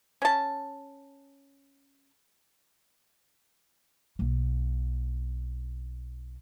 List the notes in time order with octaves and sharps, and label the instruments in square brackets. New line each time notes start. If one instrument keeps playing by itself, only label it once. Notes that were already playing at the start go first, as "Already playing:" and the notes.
[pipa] C#4 A5
[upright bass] B1 A#3